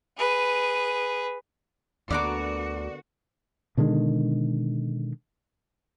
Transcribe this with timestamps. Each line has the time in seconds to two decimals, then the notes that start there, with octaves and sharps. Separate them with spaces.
0.18 G#4 B4
2.10 D2 D3 A#3 B3 F#4 D5 A#5 D6
3.77 B2 D3 D#3 G#3